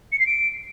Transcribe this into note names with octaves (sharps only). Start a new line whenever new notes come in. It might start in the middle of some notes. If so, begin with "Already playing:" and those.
C#7
C7
D7